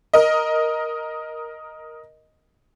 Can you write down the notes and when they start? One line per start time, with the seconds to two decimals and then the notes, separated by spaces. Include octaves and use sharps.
0.13 A#4 D#5